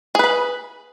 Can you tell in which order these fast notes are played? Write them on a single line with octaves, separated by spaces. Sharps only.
G#4 B4 B5